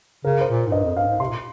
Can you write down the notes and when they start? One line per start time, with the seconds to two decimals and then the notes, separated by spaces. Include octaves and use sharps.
0.25 C#3 A#4
0.41 C5
0.48 A#2
0.66 G#2
0.72 G2 D#5
0.84 F2
0.96 G2 F5
1.08 G#2
1.20 C3 C6
1.28 A#2